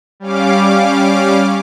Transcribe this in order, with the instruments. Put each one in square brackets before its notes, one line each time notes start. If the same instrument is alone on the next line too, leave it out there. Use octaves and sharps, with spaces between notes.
[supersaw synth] G3 C#4 F5 D6